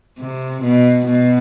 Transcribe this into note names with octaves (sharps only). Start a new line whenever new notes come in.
C3
B2
B2